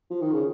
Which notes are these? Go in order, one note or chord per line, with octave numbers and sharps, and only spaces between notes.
F3
D#3
C#3